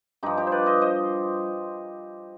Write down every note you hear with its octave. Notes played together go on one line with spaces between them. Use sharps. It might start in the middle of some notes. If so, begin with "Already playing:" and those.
G2 F3 D#4 G4
D#4 G4
C5
B4 D5
C5 D#5
C5 D#5